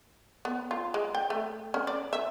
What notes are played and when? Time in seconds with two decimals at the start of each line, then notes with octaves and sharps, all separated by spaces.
0.45 B3
0.71 F4
0.94 G#3
1.14 G5
1.30 A3
1.74 C#4
1.87 D5
2.13 E5